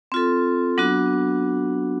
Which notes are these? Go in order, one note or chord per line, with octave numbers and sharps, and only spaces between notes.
C4 F4 A4
F#3 B3 D4 F#4